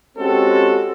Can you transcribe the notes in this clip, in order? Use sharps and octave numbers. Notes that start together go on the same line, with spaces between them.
G#3 C4 C#4 F#4 G4 A4